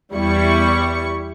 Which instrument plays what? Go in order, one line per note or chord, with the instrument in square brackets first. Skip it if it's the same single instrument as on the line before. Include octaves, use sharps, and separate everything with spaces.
[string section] E2 G3 E4 C#6